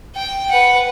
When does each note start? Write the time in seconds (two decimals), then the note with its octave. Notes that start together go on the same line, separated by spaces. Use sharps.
0.16 G5
0.51 B4 F#5